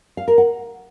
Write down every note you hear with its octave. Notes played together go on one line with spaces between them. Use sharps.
F5
A#4
F#5